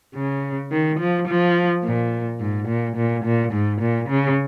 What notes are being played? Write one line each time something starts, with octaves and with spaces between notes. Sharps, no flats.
C#3
D#3
F3
F3
A#2
G#2
A#2
A#2
A#2
G#2
A#2
C#3